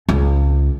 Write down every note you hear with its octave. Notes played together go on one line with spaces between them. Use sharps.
C#2